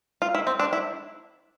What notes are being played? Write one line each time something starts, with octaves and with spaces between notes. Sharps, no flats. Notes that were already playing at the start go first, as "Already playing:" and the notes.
F4
E4
C4
D4
E4